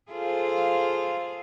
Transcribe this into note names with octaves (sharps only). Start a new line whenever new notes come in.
F4 G#4 A4 C5 F5